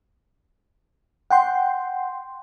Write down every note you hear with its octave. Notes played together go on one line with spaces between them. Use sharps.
F#5 G5 C6